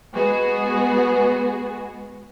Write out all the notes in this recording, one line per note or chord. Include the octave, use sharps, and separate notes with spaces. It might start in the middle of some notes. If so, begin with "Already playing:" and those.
G#3 B3 F#4 G#4